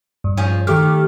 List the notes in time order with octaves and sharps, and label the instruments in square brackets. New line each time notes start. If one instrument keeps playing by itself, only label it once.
[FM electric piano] G2
[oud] F3 C#4 G#4
[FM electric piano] D#3 D6 F6 [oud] A3 G4